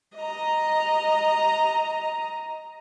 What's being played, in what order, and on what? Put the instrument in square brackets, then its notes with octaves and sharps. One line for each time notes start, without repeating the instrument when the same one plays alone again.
[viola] D#5 A#5